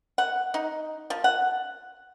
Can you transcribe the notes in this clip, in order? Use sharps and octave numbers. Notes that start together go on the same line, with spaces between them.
F#5
D#4
F3
F#5